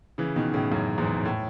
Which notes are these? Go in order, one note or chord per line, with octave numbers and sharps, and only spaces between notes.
C#3 E3
B2 D#3
A2 C#3
F#2 A2
E2 G#2
A2